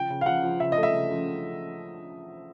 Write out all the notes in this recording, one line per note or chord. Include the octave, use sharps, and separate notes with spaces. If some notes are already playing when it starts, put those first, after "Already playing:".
Already playing: C#3 F3 G5
C#3
F5
F3 F#5
F3
C#3 E5
A3 D#5
E5
C#3
F3